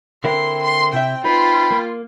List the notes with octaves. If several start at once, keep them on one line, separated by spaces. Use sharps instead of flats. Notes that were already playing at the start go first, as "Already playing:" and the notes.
D3 C4 E4 A#4 C6
C6
C3 E4 E5 G5
D#4 F4 B4 G5 B5
A#3